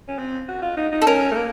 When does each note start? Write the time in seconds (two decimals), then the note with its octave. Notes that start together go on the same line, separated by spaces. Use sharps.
0.08 C#4
0.18 C4
0.49 F#4
0.62 F4
0.77 D#4
0.92 D#4
1.02 A4
1.07 C#4 A#4
1.32 A3
1.36 A#3